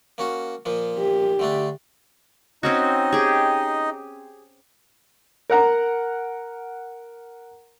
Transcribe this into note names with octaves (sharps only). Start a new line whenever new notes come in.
A#3 C#4 F#4
A#2 F3 A#3
G4
D3 A3 D4
C4 C#4 D#4 F#4 D#5
G4 G#4
A#4 F#5 A#5